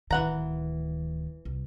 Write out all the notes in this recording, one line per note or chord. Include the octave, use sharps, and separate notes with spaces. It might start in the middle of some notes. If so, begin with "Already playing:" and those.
D1 D#3 E3 F#5 A#5
C2